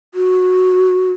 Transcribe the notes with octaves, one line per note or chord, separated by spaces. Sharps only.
F#4